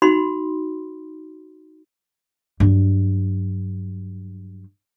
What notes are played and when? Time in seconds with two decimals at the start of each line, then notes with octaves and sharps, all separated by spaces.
0.02 D#4 F#4 B5 C6
2.60 G2 F#3